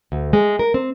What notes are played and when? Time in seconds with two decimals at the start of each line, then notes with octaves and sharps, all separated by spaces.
0.12 D2
0.33 G#3
0.59 A#4
0.74 C4